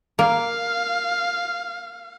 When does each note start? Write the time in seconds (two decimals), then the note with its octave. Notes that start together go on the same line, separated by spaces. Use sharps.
0.19 A#3 F5